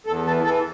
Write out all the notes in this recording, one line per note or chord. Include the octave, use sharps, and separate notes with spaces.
E2 A4
E3 A4
E3 A4